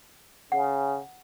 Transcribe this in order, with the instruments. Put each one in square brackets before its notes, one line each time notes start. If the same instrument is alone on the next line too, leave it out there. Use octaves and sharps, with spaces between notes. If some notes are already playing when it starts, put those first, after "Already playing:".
[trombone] C#3 [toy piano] F#5